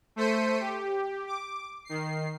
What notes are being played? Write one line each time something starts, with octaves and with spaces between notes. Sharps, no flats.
A3 C5 B6 C#7 D#7
G4
D6
D#3 C7